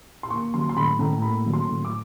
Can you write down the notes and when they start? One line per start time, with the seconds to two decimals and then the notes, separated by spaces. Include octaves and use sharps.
0.23 C6
0.30 A#3 C#6
0.54 F#3 C6
0.69 C6
0.77 A2 B5
0.99 A2 A#5
1.18 A#5
1.22 A#3 B5
1.46 F#3
1.53 C6
1.69 A2
1.85 D6